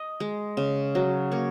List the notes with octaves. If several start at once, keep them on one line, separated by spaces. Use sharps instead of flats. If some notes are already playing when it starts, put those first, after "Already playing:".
Already playing: D#5
G#3
C#3
F#3
A#3 C#5